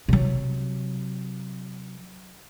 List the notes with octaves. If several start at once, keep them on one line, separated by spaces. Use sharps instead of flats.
C3 F#3